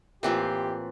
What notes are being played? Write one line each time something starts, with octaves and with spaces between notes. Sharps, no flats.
A2 E3 A#3 C4 F4 G4